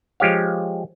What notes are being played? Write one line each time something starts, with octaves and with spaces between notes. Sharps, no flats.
F3 G#3 G4 C#5 F5